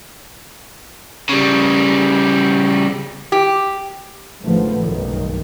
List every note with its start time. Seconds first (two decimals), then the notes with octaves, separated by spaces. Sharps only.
1.29 C#3 G3
3.32 G4
4.42 A1 G#2 D3 F3 A3 B3
4.82 F#1 B1 G2 D#3